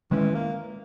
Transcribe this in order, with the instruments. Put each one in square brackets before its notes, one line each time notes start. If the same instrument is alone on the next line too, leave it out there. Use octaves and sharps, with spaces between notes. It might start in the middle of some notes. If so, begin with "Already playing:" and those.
[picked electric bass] D#3 G#3 C#4 [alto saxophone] E3
[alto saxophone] A#3